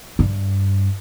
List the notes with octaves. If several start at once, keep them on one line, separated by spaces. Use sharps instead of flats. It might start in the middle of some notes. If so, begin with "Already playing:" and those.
G2